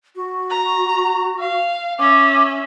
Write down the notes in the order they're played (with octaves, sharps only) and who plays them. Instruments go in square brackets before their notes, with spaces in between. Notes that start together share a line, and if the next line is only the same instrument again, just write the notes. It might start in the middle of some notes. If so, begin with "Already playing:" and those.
[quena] F#4
[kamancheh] A#5
F5
[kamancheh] C#4 E5 [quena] D6